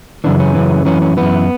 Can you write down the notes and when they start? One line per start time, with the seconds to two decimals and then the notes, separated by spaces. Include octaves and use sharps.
0.24 F#2 C#3 E3 D4
0.40 C#4
0.55 F#2 C#3 E3
0.86 F#2 E3 C#4
1.02 C#4
1.17 F#2 E3 B3